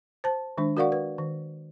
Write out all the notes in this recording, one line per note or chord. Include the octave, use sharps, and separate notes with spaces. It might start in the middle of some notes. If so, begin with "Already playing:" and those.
C5 A5
D#3 G#3 D4
F#4 A#4 D5 F5 F#5 C#6
B4
D#3